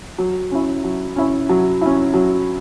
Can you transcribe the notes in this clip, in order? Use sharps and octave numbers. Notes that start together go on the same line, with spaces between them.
F#3
C#4 E4
F#3
C#4 E4
F#3
C#4 E4
F#3